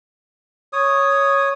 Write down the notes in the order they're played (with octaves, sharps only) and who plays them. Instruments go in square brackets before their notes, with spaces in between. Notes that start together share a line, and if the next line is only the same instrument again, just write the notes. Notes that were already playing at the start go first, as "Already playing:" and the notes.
[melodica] C#5 D#6